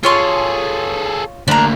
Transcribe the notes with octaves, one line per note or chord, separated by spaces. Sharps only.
F4 G#4 A4 C#5 C6
D2 A#3 D4 A#4